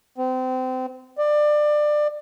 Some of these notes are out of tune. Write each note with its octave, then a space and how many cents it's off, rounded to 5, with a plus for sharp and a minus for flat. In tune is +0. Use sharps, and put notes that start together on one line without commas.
C4 -30
D5 +25